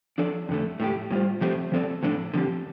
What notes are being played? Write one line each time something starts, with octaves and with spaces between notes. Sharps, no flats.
F3 D4 A4 D5
F2 D3 A3
A2 A3 D4 G4
A2 G3 F4 C5
F3 A3 C4 G4 C5
F3 C4 A4 D5
A2 F3 D4 A4
D3 F3 C4 G4